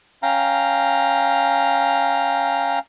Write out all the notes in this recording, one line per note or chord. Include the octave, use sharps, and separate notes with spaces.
C#4 F5 G5 A#5